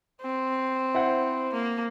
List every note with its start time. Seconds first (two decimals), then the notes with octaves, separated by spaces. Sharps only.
0.22 C4
0.94 E4 C5 F#5
1.53 A#3